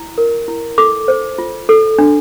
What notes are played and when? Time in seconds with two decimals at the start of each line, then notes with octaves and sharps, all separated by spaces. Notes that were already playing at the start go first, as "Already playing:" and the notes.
Already playing: E4
0.18 A#4
0.48 E4
0.78 A4 D6
1.08 C5
1.38 F4
1.69 A4
1.98 D4